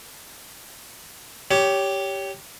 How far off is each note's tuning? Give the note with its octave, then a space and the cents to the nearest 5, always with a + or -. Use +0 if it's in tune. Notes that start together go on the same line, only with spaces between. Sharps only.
G4 +0 C#5 +20